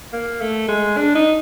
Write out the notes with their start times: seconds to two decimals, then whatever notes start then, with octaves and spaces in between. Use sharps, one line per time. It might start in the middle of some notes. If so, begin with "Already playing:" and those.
0.13 A#3
0.41 A3
0.69 G#3
0.97 D4
1.16 D#4